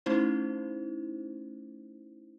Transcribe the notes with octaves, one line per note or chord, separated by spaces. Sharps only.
A3 C#4 D#4 E4 C5